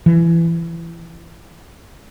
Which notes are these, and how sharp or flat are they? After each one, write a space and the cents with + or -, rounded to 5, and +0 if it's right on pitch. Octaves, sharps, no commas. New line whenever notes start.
E3 +20